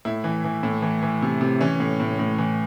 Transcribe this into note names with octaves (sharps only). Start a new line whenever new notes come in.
A2 E4
E3
E3
A2
E3
E3
C3
C3
E3 C#4
A2
A2
A2
E3